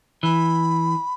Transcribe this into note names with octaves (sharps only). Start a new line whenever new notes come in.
E3 B5